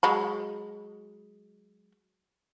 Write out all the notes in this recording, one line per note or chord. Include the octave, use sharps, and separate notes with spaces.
F#3 G#3 B5